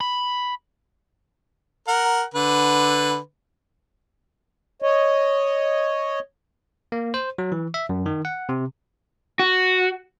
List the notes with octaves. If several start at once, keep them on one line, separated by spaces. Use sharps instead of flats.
B5
A#4 F#5
D3 B4
C#5 D#5
A#3
C5
F#3
E3
E5
F#2
D#3
F#5
C3
F#4